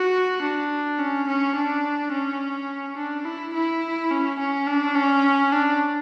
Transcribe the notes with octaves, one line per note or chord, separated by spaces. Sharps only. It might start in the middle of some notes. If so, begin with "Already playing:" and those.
Already playing: F#4
D4
C#4
C#4
D4
C#4
D4
E4
E4
C#4
C#4
D4
C#4
D4